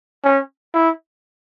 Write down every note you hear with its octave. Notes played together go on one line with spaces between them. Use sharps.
C#4
E4